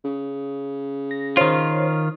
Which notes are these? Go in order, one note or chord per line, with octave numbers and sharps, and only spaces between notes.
C#3
A#6
D#3 F4 C5 C#5